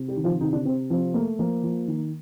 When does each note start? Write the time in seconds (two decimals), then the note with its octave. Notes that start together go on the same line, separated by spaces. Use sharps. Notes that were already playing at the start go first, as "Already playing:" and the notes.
Already playing: C3
0.08 G3 G4
0.16 D#3
0.24 F3 F4
0.41 C3 D#3 D#4
0.53 D3 D4
0.65 C3 C4
0.90 F3 C4
1.14 A3 A#3
1.39 F3 A#3
1.64 F3
1.88 D#3